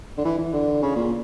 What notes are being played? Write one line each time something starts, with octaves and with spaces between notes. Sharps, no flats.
D3
E3
E3
D3
C#3
A#2